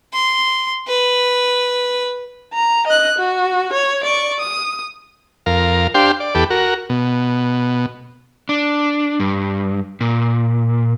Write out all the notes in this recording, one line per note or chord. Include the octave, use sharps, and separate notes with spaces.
C6
B4
A#5
D#5 F#6
F#4
C#5
D5 C#6
D#6
F2 A#4 F5
D4 G4 C5 F5 G5 C6
D5
E2 G4 A4 B4 D6
F#4 A#4
B2
D4
G2
A#2